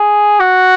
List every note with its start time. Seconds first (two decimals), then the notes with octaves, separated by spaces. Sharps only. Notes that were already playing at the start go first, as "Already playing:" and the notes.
Already playing: G#4
0.40 F#4